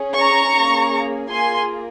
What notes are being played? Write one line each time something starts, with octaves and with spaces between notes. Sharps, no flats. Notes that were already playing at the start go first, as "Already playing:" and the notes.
Already playing: C#4 G#4
A#5 C#6
A#3 C#4 G#4
A#3 F4 G#4 G#5 C6